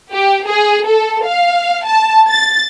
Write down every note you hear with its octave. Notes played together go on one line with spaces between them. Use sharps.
G4
G#4
A4
F5
A5
A6